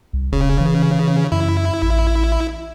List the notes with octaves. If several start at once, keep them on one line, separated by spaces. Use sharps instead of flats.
C2
E1 C#3
E3
F#2 E4
A1